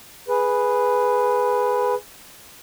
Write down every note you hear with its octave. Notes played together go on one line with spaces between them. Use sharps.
G#4 B4